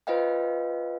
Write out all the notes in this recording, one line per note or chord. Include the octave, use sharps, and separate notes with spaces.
F4 B4 C5 D#5 F5 G5